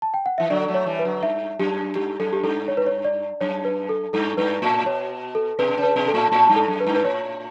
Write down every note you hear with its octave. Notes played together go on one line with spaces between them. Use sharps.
A5
G5
F#5
E3 E5
D3 F#3 D5
F#3 A3
C#5
E3 G3
B4
D3 F#3
G2 E5
F#2 G4
G2 G4
F#2 A4
G4
G2 A4
C#5
B4
C#5
D5
F#2 C#5
B4
A4
G2 A4
G2 B4
A2
B2 C#5
A4
B2 B4
C#3
B4
B2
A4
A2
A2
G2
A4
F#2
B4
G2
B4
A2 C#5